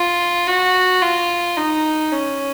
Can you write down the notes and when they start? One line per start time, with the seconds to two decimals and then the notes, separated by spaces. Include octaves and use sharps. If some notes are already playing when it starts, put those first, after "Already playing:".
Already playing: F4
0.47 F#4
1.02 F4
1.56 D#4
2.11 C#4